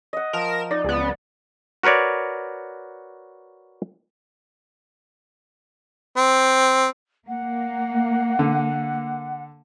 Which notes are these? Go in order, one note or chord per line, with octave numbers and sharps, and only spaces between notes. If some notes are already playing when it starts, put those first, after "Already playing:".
D#5 F#5
F3 A#4 E7
D#4 D5
C#2 B3
F#4 A#4 B4 C#5 D5
C4
A#3 F#5
D3